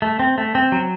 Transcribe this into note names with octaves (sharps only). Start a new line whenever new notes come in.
A3
C4
A3
C4
F#3